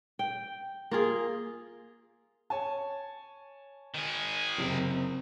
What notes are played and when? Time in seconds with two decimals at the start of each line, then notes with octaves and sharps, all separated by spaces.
0.19 G5
0.91 A#3 F4 G#4
2.50 C#5 G#5 A5
3.94 D#3 G#4
4.58 F#1 C3 D7